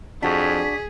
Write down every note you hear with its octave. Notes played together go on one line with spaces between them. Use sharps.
F2 D4 F#4 G#4 B6